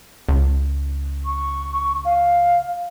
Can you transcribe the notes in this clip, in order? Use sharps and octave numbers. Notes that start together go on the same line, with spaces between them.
C#2
C#6
F5